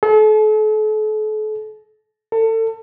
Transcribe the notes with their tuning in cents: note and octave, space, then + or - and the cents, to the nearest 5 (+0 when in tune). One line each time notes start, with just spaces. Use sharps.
A4 -40
A4 +30